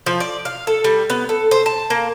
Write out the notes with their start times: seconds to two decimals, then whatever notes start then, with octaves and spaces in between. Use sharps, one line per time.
0.06 F3
0.20 D5
0.45 F5
0.67 A4
0.84 G3
1.10 B3
1.29 A4
1.51 C5
1.66 A5
1.90 A#3